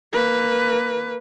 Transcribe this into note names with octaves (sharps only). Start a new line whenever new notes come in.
A#3 B4